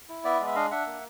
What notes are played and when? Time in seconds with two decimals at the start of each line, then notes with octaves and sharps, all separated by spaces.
0.09 E4
0.24 B3 D5 E5
0.40 G#3
0.47 E5
0.55 D4 D#5 F5
0.71 D4 E5 F#5
0.86 A#3